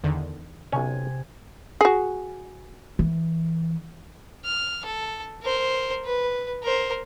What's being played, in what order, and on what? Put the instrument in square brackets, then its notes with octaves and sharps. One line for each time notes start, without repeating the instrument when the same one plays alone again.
[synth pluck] E2 D3 D#3
[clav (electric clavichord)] B1 C#4 [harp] C3 G#5
[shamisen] F#4 G#4
[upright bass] E3
[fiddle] F6
A4
A#4 C5
B4
A#4 C5